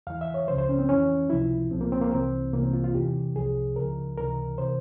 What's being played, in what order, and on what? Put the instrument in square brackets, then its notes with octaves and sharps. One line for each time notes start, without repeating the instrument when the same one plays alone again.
[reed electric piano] E2 E3 F5
E5
C#5
C#2 C#3 F3 C5
C5
C#4
C4
F2 E3 C#4
C#2 C3 F3 E4
C2 A#2 F3 C4
A#3
C4
A#3
C2 C3 E3 C4
C2 C3 E3 A#3
C4
F4
F4
E2 C3 E3 G4
C2 C3 F3 G#4
C#2 C#3 F3 A#4
C#2 C3 E3 A#4
C3 E3 C5